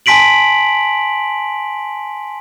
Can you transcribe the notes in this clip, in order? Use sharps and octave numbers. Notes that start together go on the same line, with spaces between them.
G#5 A5 C6 B6 D7 F#7